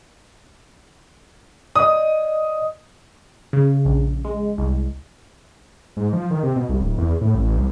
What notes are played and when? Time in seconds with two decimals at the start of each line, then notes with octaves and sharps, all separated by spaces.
1.76 D5 D#5 D#6
3.53 C#3
3.85 A#1
4.25 G#3
4.58 C2
5.97 G#2
6.13 F3
6.31 D#3
6.43 C3
6.56 B2
6.69 C2
6.80 D1
6.98 E2
7.21 A2
7.35 A1
7.57 C2